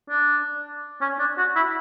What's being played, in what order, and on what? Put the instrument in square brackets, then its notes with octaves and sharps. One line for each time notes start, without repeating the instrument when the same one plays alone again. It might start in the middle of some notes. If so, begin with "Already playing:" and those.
[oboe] D4
C#4
D4
F#4
E4